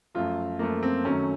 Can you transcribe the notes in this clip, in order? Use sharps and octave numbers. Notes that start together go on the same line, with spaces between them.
F#2 F3 A3 F4
F#2 F3 A3 A#3
C4
F#2 D#3 F#3 A3 C#4